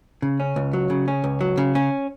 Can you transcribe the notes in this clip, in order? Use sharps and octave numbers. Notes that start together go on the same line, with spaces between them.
C#3
C#4
C#2
F#3
C#3
C#4
C#2
F#3
C#3
C#4